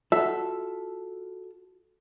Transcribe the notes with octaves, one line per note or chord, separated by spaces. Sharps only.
F4 F#4 A4 E5